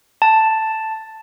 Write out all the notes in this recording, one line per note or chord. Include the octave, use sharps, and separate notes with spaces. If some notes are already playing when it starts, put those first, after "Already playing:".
A5